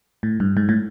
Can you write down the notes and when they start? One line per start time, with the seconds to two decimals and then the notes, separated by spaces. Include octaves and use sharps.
0.23 A2
0.40 G2
0.57 G#2
0.69 A2